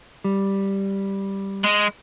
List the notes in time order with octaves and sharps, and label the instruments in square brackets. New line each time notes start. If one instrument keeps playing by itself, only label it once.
[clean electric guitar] G3
[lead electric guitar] G#3